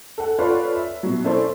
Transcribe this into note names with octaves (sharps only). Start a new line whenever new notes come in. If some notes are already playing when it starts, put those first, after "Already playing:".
A4 F#5
F4 A4 B4 C#5 D5
E5
B2 F#3
C#4 E4 A4 C5 D5